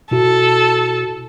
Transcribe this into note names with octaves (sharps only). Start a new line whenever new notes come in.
B2 E4 F#4 A4